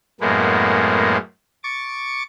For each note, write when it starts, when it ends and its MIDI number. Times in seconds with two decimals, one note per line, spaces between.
0.20 1.17 42
0.20 1.17 45
0.20 1.17 56
0.20 1.17 58
0.20 1.17 59
1.64 2.23 85
1.64 2.23 86
1.64 2.23 93